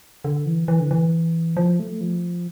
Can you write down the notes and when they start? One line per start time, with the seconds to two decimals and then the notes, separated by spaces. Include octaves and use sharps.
0.25 D3
0.46 E3
0.68 E3
0.80 D3
0.91 E3
1.57 F3
1.80 A3
2.01 F3